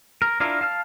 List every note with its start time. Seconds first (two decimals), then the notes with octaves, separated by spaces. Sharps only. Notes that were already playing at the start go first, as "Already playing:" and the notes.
0.22 A#4
0.40 D4 E4 F4 A#4
0.61 F5 A5 F6